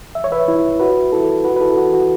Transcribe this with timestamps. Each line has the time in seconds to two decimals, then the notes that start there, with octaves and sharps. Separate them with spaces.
0.15 E5
0.24 C#5
0.32 B4 E5
0.48 E4
0.80 F#4 B4
1.12 E4 A4
1.44 F#4 B4
1.56 B4
1.61 E4 A4
1.77 F#4
1.94 F#4